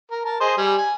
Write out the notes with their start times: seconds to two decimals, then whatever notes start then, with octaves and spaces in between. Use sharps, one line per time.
0.11 A#4
0.25 A#4 A5
0.40 G#4 C5 D#5
0.57 G3 G#5
0.78 G#5